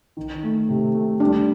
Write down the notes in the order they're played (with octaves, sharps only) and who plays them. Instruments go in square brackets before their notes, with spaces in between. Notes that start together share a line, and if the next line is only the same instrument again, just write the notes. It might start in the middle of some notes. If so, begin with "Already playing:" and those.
[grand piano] D#3
A3
C3
A3
[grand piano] G3 [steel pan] D4